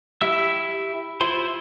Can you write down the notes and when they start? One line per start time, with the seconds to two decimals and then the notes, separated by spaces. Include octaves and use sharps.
0.21 E4 G4 E5 E6
1.21 E4 F4 C5 C6